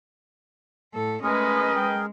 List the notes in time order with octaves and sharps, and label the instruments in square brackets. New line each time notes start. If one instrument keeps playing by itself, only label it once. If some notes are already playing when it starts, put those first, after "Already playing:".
[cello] A2 A4
[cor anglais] G#3 [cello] A3 C#4 [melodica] G#4 A#4 [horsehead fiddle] B4 D#5
[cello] G#3 [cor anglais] G5